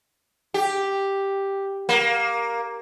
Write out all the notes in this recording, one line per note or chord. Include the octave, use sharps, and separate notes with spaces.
G4
A#3